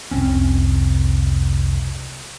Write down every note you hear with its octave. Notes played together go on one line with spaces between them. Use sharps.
F1 C2 C4 C#4